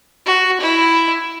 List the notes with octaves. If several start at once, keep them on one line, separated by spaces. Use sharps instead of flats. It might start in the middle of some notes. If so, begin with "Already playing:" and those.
F#4
E4